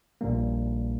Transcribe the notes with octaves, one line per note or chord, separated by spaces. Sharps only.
A#1 A#2 G3 A#3